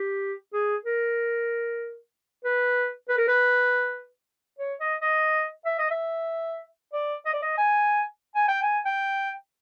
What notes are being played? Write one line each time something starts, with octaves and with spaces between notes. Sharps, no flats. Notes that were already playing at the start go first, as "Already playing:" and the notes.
Already playing: G4
G#4
A#4
B4
B4
A#4
B4
C#5
D#5
D#5
E5
D#5
E5
D5
D#5
D5
D#5
G#5
G#5
G5
G#5
G5